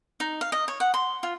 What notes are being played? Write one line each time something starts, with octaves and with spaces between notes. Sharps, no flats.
D#4
F5
D#5
C#5
F#5
C6
F4